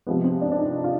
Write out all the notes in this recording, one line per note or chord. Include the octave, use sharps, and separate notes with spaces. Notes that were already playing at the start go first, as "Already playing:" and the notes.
C3 F3 G#3 B3
C4
D4
D4
D#4
F4